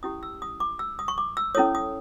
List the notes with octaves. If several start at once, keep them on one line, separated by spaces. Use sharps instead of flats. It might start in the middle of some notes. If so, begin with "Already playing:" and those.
C#4 E4 G4 D#6
E6
D#6
D6
E6
D#6
C#6
D6
E6
C#4 E4 A4 C#5 D#6
D#6